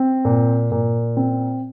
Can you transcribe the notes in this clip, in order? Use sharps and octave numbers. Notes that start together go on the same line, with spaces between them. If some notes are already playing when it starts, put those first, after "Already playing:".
Already playing: C4
A#2
A#2
C4